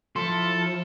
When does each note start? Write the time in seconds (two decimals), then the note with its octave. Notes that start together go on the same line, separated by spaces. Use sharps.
0.16 F3 E4 A4 C6